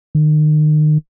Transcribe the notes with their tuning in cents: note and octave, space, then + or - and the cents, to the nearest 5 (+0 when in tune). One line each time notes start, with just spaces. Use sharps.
D#3 -35